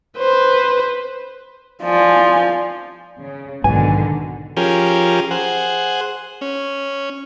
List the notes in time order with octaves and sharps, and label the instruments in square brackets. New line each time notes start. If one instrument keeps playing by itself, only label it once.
[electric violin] B4 C5
[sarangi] F3 [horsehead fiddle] D5 G#5
[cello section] C#3
[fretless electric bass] B1 G#2 B3 [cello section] B2 D3 D#3 [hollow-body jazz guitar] G#5
[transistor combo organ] F3 C#4 G4 G#4 A#4
G#4 C5 F#5
C#4